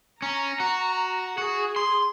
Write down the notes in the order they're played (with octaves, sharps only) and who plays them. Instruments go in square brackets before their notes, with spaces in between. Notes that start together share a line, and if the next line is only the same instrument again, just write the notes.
[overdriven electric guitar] C#4 [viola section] A#5
[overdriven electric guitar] F#4
[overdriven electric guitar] F#4 [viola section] G#4
[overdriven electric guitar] C6